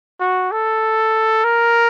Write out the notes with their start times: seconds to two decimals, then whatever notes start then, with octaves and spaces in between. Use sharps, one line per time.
0.20 F#4
0.52 A4
1.44 A#4